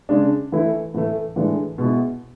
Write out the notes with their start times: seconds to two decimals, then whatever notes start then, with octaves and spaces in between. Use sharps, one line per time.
0.09 C#3 G#3 D4
0.52 E3 A3 E4
0.94 A2 E3 A3
1.36 A2 E3 G#3 D4
1.78 B2 G#3 B3 E4